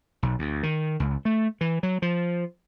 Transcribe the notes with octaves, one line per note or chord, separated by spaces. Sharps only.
B1
D2
D#3
C#2
A3
E3
F#3
F3